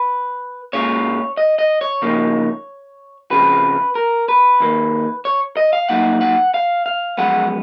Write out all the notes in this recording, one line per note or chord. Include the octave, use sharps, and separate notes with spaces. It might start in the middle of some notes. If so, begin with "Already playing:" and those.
Already playing: B4
A#2 G#3 C#4 F4 C#5
D#5
D#5
C#5
C#3 F3 A#3 D#4
F2 C#3 F3 B4
A#4
B4
D#2 D#3 A#3
C#5
D#5
F5
A#2 F#3 A#3 D#4 F#5
F#5
F5
F5
F#2 F3 G#3 B3 F#5